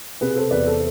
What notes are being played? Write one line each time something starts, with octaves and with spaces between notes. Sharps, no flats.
C3 G#4 B4
A4 C5
E2 B4 D5
A4 C5